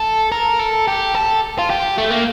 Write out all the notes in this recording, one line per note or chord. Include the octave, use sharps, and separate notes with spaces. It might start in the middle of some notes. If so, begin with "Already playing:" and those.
Already playing: A4
A#4
A4
G4
A4
F4
G4
A3
A#3